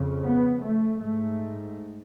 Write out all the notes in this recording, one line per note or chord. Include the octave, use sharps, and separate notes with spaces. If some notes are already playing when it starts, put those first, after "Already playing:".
Already playing: F2 C#3
B3
A3
G#2 A3